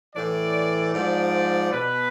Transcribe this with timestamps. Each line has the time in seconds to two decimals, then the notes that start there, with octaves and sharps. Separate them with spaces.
0.15 A2 E3 D5
0.94 G#2 F3 D5
1.72 B2 B4